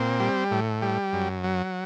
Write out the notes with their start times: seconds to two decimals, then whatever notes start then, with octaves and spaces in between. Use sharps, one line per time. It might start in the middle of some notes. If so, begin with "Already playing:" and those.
Already playing: A#2 C4
0.20 G3
0.51 A2
0.82 G3
1.13 F#2
1.44 F#3